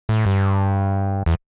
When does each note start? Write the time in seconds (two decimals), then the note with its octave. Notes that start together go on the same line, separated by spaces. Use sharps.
0.09 A2
0.26 G2
1.26 E2